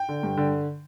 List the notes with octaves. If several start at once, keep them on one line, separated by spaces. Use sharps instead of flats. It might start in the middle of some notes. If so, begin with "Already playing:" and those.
Already playing: G5
D3
G2
D3